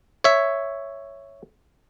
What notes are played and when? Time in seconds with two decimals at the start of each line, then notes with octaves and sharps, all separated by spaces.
0.24 C#5 E5